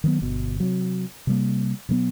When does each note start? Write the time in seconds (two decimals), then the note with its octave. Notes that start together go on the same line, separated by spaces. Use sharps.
0.04 D#3 F#3 B3
0.22 G1 B2
0.60 C3 F#3
1.27 C3 G3 A#3
1.89 B2 F#3 A#3 B3